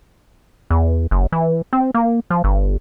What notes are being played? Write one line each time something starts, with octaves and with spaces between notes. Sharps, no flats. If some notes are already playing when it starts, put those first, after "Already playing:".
E2
F#1
E3
C4
A#3
F3
G1